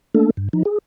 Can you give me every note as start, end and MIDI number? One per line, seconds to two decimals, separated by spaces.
0.15 0.30 57
0.15 0.30 58
0.15 0.30 62
0.15 0.30 69
0.37 0.49 43
0.53 0.63 53
0.53 0.63 63
0.65 0.78 68